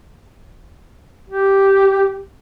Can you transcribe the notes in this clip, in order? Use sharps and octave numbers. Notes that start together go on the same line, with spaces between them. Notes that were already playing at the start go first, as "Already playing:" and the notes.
G4